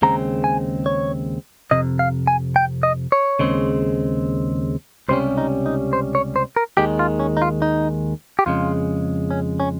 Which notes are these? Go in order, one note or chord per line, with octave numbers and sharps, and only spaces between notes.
D#2 C#3 G#3 C4 A#5
G#5
C#5
F2 C3 D#5
F5
G#5
G5
D#5
C#5
D#2 C#3 G#3 C4
C#2 C3 G3 C#4 C5
D#4
D#4
C5
C#5
C5
A#4
D#2 D#3 G#3 G4
F4
C#4
D#4
F4
D#4
G4
F2 C#3 G#3 F4
C#4
C#4